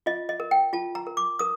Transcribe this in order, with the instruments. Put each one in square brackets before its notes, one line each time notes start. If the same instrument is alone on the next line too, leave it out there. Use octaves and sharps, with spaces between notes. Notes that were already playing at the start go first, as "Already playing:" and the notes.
[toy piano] F4 D#5
D#5
A#4
G5
F4 A5
A#5
A#4
D6
A#4 D#6